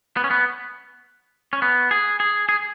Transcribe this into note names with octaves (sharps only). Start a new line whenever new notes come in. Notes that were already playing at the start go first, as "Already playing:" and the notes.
B3
C#4
B3
C#4
B3
G#4
G#4
G#4